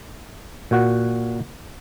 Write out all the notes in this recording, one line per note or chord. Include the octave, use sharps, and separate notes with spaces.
A#2 F#4 F#5